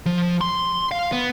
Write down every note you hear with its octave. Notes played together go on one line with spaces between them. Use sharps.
F3
C6
F5
B3